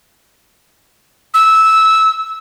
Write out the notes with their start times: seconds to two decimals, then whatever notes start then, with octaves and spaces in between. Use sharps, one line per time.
1.34 E6